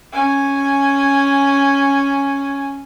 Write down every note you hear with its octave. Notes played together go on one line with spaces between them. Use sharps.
C#4 G#5